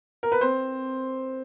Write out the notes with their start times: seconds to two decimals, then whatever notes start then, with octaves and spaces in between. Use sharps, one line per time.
0.23 A#4
0.32 B4
0.41 C4 C5